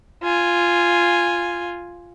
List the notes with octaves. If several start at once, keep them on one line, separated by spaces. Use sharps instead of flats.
F4 G#5